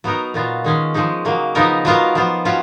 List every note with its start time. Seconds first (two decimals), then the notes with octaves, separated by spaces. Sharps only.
0.04 F#3 B3 D#4 A#4
0.34 A#2 F#3 B3 F4
0.64 D#3 G#3 C#4
0.94 F3 G#3 D#4
1.25 C#3 F#3 A#3
1.55 C#3 F3 B3 D#4 A#4
1.85 F#3 B3 F4 A#4
2.15 F3 B3 F4
2.45 F#3 C#4 F4